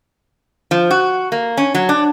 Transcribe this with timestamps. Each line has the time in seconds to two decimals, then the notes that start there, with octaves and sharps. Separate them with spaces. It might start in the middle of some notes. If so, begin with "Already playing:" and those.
0.71 F3
0.91 F#4
1.32 A#3
1.57 C#4
1.75 F#3
1.89 D4